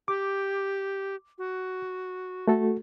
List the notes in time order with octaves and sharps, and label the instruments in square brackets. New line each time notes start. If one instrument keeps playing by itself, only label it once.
[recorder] G4 [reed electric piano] D6
[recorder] F#4
[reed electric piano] A3 F#4 A4